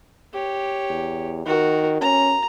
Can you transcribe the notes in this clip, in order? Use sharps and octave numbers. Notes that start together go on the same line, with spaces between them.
G4 C#5
E2
D#3 F#4 A#4
C#4 A#5